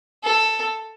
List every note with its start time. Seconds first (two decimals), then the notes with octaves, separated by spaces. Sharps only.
0.24 A4